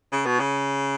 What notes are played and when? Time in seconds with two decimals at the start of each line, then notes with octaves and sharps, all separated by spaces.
0.12 C#3
0.26 B2
0.39 C#3